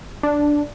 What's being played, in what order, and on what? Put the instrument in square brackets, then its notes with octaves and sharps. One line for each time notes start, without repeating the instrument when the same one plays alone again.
[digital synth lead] D4